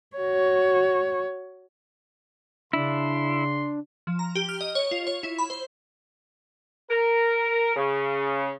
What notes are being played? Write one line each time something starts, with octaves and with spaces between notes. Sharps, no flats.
F#4 C#5
C#3 D4 E4 C6
F3
A#5
G4
F6
D#5
C#5
F4
C#5
E4
B5
C5
A#4
C#3